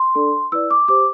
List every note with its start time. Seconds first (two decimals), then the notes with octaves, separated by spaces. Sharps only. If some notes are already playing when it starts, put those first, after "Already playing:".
Already playing: C6
0.15 D4 A4 D5
0.52 E4 B4 D5 E6
0.71 D6
0.88 G4 C5 D6